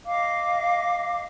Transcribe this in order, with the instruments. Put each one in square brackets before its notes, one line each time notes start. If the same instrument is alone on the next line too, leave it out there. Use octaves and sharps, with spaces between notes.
[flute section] D#5 F5 D6